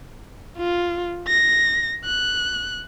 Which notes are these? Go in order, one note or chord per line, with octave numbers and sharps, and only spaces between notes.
F4
A#6
F#6